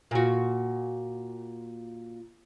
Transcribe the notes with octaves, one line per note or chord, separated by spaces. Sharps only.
A#2 F#4